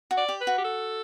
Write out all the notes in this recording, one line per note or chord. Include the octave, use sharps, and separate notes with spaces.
F#4
D5
G4
B4
F#4
G4
A4